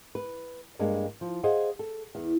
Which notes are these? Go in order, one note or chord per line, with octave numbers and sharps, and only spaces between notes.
B4
G2 G#3 A#3 D4
F3
G#4 C5 D#5 F5 F#5
A4
E2